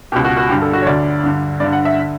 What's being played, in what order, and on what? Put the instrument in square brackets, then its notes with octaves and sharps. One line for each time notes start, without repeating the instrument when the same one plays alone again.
[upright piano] C#2 B2 G4
F#4
F#4
G2 D3 G4
A4
F#4
C#5
D2 D3 D5
G2 D3
G2 D5
D3
F#5
E5
D3